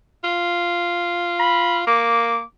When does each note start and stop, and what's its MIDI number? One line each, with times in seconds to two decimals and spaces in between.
0.24 1.84 65
1.40 1.78 83
1.87 2.41 58
1.87 2.42 86